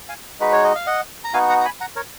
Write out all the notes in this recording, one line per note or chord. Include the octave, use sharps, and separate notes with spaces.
F5 G#5
G#3 D#4 F#4 B4
C#5
D#5
F5
D#5 F#5
A#5
B3 D#4 F#4 F5 G#5
F#5 A#5
A#5
G#5 B5
F#5 A#5
A#4 C#5